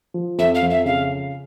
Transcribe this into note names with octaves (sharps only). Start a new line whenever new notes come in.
F3
F2 E5
F5
F2
E5
C#3 F5